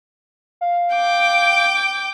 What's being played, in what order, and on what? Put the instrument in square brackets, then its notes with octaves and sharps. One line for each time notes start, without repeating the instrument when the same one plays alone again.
[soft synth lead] F5
[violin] G5 D6